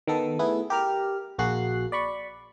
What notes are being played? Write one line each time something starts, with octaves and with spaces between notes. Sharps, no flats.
D#3 B3 A4
A3 B3 E4 G#4 B4
G4 A#4 F6
A#1 A#3 F#4 G#4 F#6 C7
D5 B5 C#6